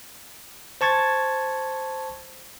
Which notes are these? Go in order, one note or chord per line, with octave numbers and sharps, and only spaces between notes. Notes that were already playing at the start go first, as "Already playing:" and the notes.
C5 A5 C#6 G#6 A6